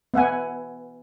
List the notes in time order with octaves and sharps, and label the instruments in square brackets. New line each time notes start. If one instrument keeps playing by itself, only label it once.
[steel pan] B3 E5 F#5 G#5